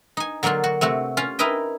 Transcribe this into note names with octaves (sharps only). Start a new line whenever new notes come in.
D#4 G#5
D3 F#3 A#3 D4 F4
F#4
C3 A3 C4 F#4
C#4 F4
D#4 E4 A#4 B4 D#5 G5